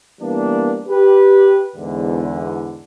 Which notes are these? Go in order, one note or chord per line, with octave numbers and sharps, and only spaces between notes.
E3 G3 A#3 B3 D4
G4 B4
E2 G#2 D3